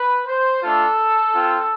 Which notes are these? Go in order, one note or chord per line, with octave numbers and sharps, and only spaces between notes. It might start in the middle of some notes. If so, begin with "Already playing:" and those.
Already playing: B4
C5
A3 D4 F4 A4
C4 F4